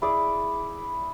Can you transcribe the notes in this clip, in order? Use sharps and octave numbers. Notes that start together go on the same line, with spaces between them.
E4 G#4 D5